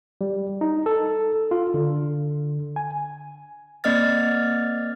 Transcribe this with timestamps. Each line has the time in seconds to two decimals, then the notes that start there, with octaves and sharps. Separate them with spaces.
0.21 G3
0.61 D#4
0.86 A4
1.51 F4
1.74 D3
2.76 G#5
3.84 A#3 C4 D5 D#5 F6 A6